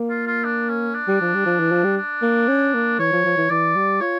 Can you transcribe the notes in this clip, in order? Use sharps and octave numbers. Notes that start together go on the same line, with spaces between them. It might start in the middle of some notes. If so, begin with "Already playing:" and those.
Already playing: A#3
F4
F4
D4
C#4
D4
G3
F3
G3
F3
E3
F3
G3
D4
A#3
C#4
A#3
E3 C#5
F3
F3
E3
E3 D5
G3
F4 C#5